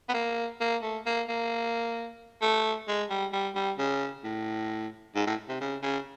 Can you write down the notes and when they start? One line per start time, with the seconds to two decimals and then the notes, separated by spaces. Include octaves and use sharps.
0.09 B3
0.14 A#3
0.61 A#3
0.83 A3
1.06 A#3
1.29 A#3
2.42 A3
2.88 G#3
3.10 G3
3.33 G3
3.55 G3
3.78 C#3
4.24 A2
5.15 G#2
5.27 A2
5.49 C3
5.61 C#3
5.82 C#3